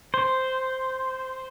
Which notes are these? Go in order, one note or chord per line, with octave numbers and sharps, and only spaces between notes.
C5